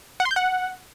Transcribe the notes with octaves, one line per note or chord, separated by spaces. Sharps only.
F#5
C6
G6
F#5